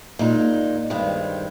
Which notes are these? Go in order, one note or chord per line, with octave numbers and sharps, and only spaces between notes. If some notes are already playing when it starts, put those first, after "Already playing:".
A#2 G#3 D#4
G2 D#3 G#3 C4